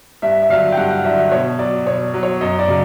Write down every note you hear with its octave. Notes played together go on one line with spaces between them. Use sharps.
G2 E5
E5
D3 F#3 F5
G5
G2 F#5
F#5
D3 F#3 E5
E5
B2 C#5
F#3 D5
B2 C#5
F#3
C#5
F#2 D#5
D5
C#3 F#3